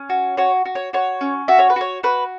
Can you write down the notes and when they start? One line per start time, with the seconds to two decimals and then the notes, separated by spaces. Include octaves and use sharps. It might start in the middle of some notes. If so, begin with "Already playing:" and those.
Already playing: C#4
0.10 F#4
0.37 F#4 C#5
0.65 F#4
0.75 C#5
0.93 F#4 C#5
1.21 C#4
1.48 F#4 E5
1.59 C#5
1.70 B4
1.76 F#4 C#5
2.03 F#4 B4